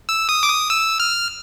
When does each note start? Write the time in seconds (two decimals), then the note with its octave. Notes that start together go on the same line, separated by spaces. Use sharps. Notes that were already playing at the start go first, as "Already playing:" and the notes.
0.09 E6
0.29 D#6
0.43 D6
0.50 D#6
0.70 E6
1.00 F6